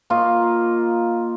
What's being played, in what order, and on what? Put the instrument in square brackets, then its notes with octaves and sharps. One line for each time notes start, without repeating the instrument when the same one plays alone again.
[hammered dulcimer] A#3 D#4 F4 C#6